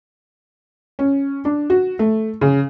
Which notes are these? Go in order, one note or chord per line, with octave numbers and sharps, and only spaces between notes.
C#4
D4
F#4
A3
C#3